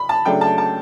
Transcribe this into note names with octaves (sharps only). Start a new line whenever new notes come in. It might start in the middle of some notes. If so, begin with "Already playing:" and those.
Already playing: B5
A5
C#3 F#3 A3 D4 G5
A5
A5